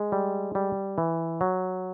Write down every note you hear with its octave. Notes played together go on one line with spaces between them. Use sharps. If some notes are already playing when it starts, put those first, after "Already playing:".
Already playing: G#3
G3
G3
E3
F#3